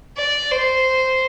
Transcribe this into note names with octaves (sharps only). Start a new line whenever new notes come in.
D5
C5